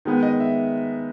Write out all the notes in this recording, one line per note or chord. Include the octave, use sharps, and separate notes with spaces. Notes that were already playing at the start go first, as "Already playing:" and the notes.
D#3 G#3 B3
D#5
E5